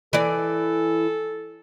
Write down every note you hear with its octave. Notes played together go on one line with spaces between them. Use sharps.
E3 A4 D5